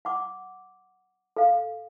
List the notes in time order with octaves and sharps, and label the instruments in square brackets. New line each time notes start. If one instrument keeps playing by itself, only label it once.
[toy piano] F#5 D6
A4 F5